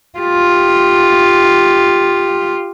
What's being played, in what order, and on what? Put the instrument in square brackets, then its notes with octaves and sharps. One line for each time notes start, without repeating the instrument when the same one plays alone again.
[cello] F4 G4